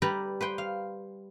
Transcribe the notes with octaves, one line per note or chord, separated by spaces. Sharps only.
G3 G4 B4 D5 A#5 B5
B4 C5 G5
F5